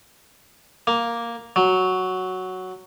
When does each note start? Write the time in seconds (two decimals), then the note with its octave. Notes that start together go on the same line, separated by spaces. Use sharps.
0.87 A#3
1.56 F#3